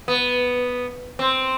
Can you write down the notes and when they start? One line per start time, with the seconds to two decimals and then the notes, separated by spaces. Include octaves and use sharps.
0.08 B3
1.19 C4